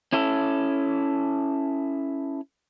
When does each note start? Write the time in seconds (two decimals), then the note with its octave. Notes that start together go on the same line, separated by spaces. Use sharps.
0.13 C#4 E4 A4